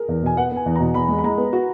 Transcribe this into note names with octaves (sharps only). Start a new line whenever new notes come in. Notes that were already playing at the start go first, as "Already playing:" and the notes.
Already playing: G#4 A#4
E2
B2 G#5
B3 F#5
B3 G#5
E2
A#5
B2
E2 B5
G#3
B5
G#3 A#5
B3
F#4